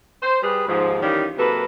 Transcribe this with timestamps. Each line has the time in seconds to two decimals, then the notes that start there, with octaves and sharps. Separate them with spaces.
0.22 C5
0.43 G3 G4 G#4 B4
0.67 D#2 G#2 F3
1.02 D#3 E3 G3 C#4 F4 G4
1.37 C3 F#3 A#3 A4 B4